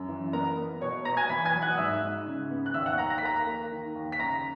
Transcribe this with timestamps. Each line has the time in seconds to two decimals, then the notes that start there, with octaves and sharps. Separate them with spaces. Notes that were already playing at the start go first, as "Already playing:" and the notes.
Already playing: F#2
0.08 E3
0.33 B3 A#4 A#5
0.57 B3
0.81 B2 C#5 C#6
1.05 B2 A#5 A#6
1.17 G#5 G#6
1.29 E2 B5 B6
1.45 G#5 G#6
1.53 F#3
1.62 F#5 F#6
1.70 D#6
1.77 G#2 E5 E6
2.03 G#2
2.26 C#3
2.51 B3
2.66 F#6
2.74 D#2 E5 E6
2.86 F#5 F#6
2.98 D#2 A#5 A#6
3.10 A#6
3.18 B6
3.23 A#3 A#5 A#6
3.47 A#3
3.71 D#3
3.95 D#2
4.12 B6
4.19 C#3 A#5 A#6